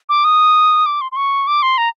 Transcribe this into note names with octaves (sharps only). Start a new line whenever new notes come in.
D6
D#6
D6
C6
C6
C#6
D6
C6
A#5